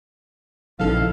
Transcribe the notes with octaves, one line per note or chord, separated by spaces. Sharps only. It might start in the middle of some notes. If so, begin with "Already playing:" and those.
A#1 C#3 F3 B3 D#4 E4 A4 F5